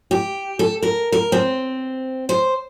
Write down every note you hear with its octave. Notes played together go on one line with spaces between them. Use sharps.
G4
A4
A#4
A#4
C4
C5